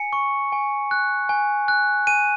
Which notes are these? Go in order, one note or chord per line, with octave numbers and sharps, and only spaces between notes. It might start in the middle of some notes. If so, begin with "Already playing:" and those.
Already playing: G#5 C#7
C#6
G#5
F#6
G#5
F#6
G#5 D#7